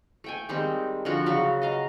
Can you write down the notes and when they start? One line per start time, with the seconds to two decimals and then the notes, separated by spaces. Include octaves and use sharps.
0.24 A3 G5 G#5
0.49 D#3 G3 G#3 C4
1.05 D3 F3 F#4 A#4
1.26 C#3 F#3 C#4 F#4
1.62 D#5 F5 A#5